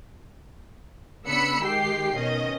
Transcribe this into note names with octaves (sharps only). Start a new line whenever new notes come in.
C#3 B3 D4 B5 E6 C#7
D#3 G#3 G4 G5 C7
B2 D#3 C#4 D#5